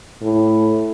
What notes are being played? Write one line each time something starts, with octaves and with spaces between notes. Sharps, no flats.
A2